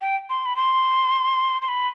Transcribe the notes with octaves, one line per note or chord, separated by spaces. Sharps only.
G5
C6
B5
C6
C6
B5